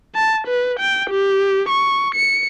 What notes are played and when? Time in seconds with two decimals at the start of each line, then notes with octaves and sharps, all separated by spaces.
0.15 A5
0.47 B4
0.80 G5
1.10 G4
1.69 C#6
2.15 C#7